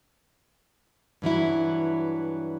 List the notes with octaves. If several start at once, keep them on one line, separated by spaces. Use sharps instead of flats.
G2 E3 F#3 E4